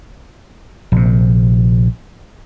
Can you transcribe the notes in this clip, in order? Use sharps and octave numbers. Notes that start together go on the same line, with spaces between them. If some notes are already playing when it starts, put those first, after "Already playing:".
A#1 C3